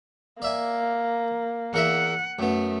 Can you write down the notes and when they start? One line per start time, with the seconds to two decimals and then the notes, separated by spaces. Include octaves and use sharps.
0.42 A#3 D5 E5 G#5
1.74 E2 A#4 E5 F#5
2.39 F#2 A3 B3